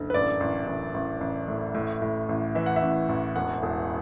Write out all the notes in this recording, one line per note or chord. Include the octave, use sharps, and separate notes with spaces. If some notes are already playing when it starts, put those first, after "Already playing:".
Already playing: F#1 D3
B4
A1 D5
A1
A1
A1
A1
A2
A2
A2
A1
E3 E5
F#5
E5
A1
A1
E1 F#5
E1